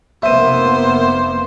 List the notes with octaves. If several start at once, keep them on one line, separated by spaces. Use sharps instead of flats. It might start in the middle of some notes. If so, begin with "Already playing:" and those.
F1 A#3 B3 C5 E5 D#7